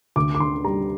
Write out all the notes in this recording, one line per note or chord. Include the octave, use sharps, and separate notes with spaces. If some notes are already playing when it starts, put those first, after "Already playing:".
D2 D6
D6
D3 C6
G3 A#5